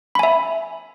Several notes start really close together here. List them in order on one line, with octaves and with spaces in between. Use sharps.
B5 G#5 E5